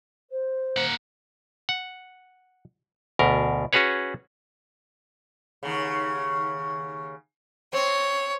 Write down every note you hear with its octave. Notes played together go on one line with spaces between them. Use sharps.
C5
A#3 F#5
F#5
D2 B2 A#4
C#4 F#4 G#4 B4 C#5
D#2 C#3
C4 C#5